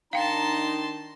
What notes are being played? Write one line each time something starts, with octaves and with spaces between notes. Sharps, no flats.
D#3 D4 D#4 F5 G5 A5 A#5 C6